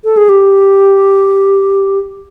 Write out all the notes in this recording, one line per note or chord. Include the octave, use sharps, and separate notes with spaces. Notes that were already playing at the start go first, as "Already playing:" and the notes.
A4
G#4
G4